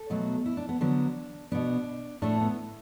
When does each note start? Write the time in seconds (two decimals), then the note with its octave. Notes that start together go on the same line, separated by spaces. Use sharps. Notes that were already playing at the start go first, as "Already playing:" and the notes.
Already playing: A4
0.10 B2 F#3 A3
0.46 E4
0.57 D4
0.69 B3
0.81 D3 F#3 B3 D4
1.52 B2 B3 D4
2.22 A2 A3 D4
2.40 B3